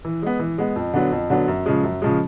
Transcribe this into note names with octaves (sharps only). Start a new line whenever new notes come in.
E3
G#3 B3
E3
G#3 B3
F2
D3 F#3 B3 D4
F2
D3 F#3 B3 D4
F#2
C#3 F3 G#3
F#2
C#3 F3 G#3